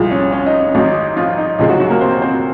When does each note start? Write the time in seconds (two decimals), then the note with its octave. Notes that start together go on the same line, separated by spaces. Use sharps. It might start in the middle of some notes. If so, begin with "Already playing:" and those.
Already playing: C2 A#2 F3 G#3 F4
0.11 C#4
0.32 C#4
0.46 D#4
0.61 C#4
0.75 G#1 G#2 F#3 D#4
1.17 F3 F4
1.38 D#4
1.59 C#2 C3 F3 G#3 D#4
1.69 F#3 F#4
1.80 F#3 F#4
1.90 A#3 A#4
2.01 C4 C5
2.22 C4 C5